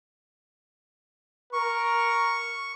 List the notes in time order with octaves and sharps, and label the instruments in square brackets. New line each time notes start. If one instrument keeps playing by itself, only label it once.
[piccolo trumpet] A#4 [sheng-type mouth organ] C#6